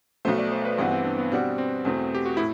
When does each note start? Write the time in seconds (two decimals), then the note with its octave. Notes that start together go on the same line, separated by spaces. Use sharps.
0.25 B1 B2 A3 C5
0.38 D5
0.52 C5
0.65 B4
0.78 G2 E3 B3 C4 F#4
0.91 C4
1.05 D4
1.18 B3
1.32 B2 G3 C4 D4 F#4
1.58 C4
1.85 E2 B2 A3 C4
2.15 G4
2.26 F#4
2.37 A2 E4